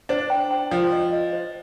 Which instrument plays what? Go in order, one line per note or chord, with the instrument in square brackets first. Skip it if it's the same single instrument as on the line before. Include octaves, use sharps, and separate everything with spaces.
[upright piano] D4 [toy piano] C5
[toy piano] G5
G5
[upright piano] F3 [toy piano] C5
[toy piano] D#5
D#5
C5